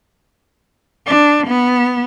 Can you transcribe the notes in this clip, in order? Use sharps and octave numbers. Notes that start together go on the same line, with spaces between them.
D4
B3